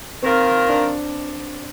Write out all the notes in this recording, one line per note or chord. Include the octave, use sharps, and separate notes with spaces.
D#3 A#3 C4 F4 A#4
D4